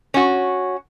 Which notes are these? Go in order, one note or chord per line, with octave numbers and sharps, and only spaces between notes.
C#4 F#4